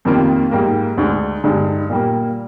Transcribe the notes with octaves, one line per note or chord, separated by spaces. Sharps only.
F2 D#3 G3 A#3 F4
G#2 G3 A#3
D2 D3 G#3
G2 D3 G#3 D#4
A#2 G3 A#3